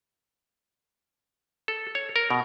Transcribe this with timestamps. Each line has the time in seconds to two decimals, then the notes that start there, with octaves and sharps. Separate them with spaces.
1.68 A4
1.95 C#5
2.16 A#4
2.30 B2